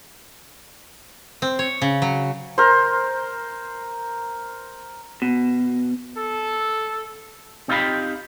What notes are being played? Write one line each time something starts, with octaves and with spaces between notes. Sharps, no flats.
C4
C#5
C#3
F#3
A#4 C5
B2
A4
C4 D#4 F4 G4 F5 B5